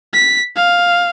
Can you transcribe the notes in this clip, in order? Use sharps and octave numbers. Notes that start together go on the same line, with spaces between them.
B6
F5